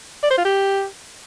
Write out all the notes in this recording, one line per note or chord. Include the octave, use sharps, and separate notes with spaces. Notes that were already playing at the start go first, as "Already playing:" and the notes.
D5
C5
F4
G4